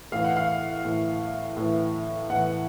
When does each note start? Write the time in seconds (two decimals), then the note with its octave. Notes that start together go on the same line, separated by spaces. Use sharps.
0.12 A2 E3 F5
0.24 F#5
0.37 F5
0.85 A2 E3
1.57 A2 E3
2.30 A2 E3 F#5